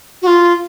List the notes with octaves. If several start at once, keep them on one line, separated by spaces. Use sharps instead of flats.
F#4
F4